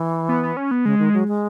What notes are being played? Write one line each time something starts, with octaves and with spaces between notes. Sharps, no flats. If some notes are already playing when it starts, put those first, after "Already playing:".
Already playing: E3
B3
B3
C#4
B3
C#3 G#3
D#3
F#3
G#3